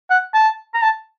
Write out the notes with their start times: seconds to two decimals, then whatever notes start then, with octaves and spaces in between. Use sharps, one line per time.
0.10 F#5
0.34 A5
0.74 A#5
0.82 A5